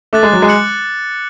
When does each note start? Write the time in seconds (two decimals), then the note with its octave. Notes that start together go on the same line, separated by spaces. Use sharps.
0.13 A3 D6 F#6 A6
0.23 G#3
0.33 F#3
0.42 G#3
0.48 F#6 C#7 F#7